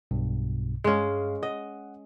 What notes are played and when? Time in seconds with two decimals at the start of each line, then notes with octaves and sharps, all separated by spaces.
0.11 B1 G2 B2
0.84 G2 G#3 C#4 G#4 F5
1.43 D#5 F#5